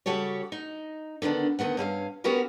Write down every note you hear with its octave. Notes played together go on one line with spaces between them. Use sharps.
C#3 G3 F#4 G4 A4 C#5
D#4
D3 D#3 B3 D4
D2 D#3 B3 F#5
G2 C#4 A4 F5
B3 C#4 F#4 G4 A#4 B4